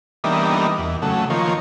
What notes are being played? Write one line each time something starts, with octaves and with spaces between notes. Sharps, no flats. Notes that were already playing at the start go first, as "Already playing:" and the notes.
E3 G3 A#3 B3 D4 D#4
E2
C#3 F#3 A3
D#3 F3 A#3 C#5